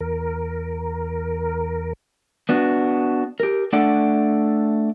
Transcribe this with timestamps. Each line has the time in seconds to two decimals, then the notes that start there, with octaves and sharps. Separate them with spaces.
0.01 E2 A#4
2.49 B3 D4 F#4
3.40 G4 A#4
3.73 A3 D4 A4 D5 F#5